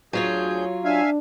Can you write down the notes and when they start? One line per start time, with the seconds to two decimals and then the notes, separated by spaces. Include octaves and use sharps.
0.13 D2 F#3 F4 G#4 C#5 G6
0.85 D4 E5 F5 G#5